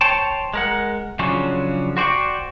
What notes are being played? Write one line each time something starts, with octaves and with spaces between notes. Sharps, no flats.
C5 C#5 G5 A5
G#3 A#4 F#5
C#3 F3 F#3 C#4 D4
F#4 C5 D5 G5 C#6